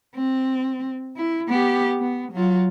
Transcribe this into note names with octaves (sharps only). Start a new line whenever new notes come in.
C4
E4
B3 G4
B3
F#3 F4